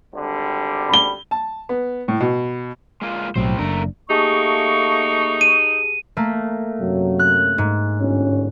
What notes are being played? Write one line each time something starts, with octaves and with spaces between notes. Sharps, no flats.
G#1 D3 G3
B5 G7
A5
B3
A2
B2
G#3 A#3 F4
B1 A2 F#3 G3 C4 C5
F#1 A3 D4 A#4
A3 A#3 D#4 G4 G#4 A5 C#6
D#7
A3 A#3
F#2 C3 F#3
F#6
G#2
G1 C#4